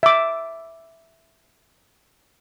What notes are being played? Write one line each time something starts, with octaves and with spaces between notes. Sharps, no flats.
E5 D6